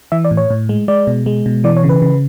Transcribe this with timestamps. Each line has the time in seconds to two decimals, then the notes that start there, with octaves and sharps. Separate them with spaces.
0.12 E3 E5
0.25 D5
0.31 A2
0.37 C#5
0.50 A2
0.69 G#3
0.88 G#3 D5
1.07 B2
1.26 G#3
1.46 B2
1.64 E3 D5
1.77 C#5
1.83 C#3
1.89 B4
2.02 C#3